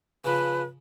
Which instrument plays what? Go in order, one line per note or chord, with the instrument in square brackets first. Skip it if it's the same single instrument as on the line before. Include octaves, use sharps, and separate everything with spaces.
[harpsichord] C#3 F3 [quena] B4